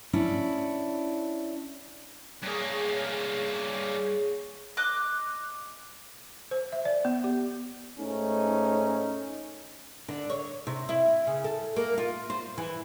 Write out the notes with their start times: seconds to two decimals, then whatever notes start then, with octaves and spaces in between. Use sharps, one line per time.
0.13 C#4 D4 E4
2.43 G2 A#3 G#4 C#5
4.77 D#5 D6 F#6
6.51 C5
6.72 E5
6.85 D5
7.05 B3
7.24 G4
7.99 G#2 A3 C#4 D#4
10.08 D3
10.30 C#5
10.67 C3
10.89 E4
11.27 C#3
11.44 A4
11.76 A#3
11.98 F4
12.30 C5
12.58 E3